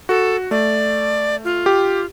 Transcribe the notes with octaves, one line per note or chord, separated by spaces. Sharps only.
F#4 A4
A3 D5
F4
G4